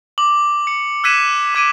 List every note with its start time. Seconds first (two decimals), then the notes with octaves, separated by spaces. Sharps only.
0.18 D6 F#7
0.67 C#7
1.04 E6 F#6 G#6 B6 D#7 E7
1.55 D6 G#6 D7 D#7